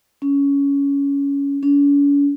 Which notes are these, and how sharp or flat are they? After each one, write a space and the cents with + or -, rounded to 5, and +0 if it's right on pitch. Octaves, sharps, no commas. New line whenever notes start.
C#4 +15
C#4 +45